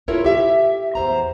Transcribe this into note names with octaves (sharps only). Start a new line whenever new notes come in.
E4 F4 A4 A#4 C#5
G4 E5
E2 C5 A#5